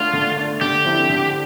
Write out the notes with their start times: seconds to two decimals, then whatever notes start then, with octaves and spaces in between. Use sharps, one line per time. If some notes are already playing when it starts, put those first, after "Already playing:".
Already playing: D3 A3 D4 F4
0.13 D3
0.37 A3 D4
0.61 D3 G4
0.84 F3 C4 E4
1.10 D3